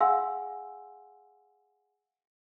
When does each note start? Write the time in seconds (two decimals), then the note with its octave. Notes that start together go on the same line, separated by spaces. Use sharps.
0.01 G#4 F5 F#5 G#5 C6 E6